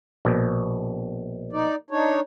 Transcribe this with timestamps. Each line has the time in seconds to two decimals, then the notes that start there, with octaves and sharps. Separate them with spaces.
0.25 A#1 B2
1.53 D#4 D5
1.90 D4 D#4 C#5